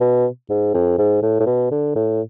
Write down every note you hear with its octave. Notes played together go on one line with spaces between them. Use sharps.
B2
G#2
F2
G#2
A2
A2
B2
D3
A2